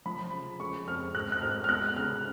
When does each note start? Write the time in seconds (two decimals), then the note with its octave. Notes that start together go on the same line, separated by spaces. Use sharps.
0.06 F3 B5
0.33 C#3
0.60 G#3 C#6
0.87 F2 F6
1.15 G#2 F#6
1.32 F#6
1.42 G#2 F6
1.64 F6
1.69 B3 F#6
1.96 C#3 F6